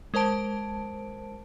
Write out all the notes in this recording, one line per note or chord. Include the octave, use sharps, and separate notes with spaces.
G#3 A#4 C5 A5 D7